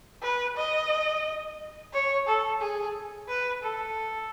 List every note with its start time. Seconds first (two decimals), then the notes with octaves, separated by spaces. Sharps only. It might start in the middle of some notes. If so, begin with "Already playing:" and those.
0.22 B4
0.57 D#5
1.93 C#5
2.27 A4
2.61 G#4
3.28 B4
3.63 A4